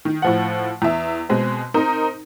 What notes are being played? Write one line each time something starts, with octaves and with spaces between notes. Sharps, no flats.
D#3
A2 F3 F#5
E2 E5
B2 G#3 C4
C4 D#4 A#4 C5